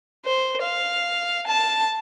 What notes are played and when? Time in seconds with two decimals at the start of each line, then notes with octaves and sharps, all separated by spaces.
0.25 C5
0.62 F5
1.47 A5